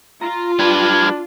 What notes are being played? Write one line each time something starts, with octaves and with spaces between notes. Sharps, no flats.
F4 A#5
G3 D4 B4 F6 G#6